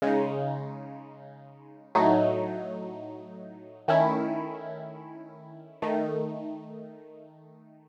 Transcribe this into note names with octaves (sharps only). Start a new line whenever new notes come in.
C#3 G#3 D#4
A2 F#3 A3 D#4
D#3 A3 C#4 E4
D#3 A3 D#4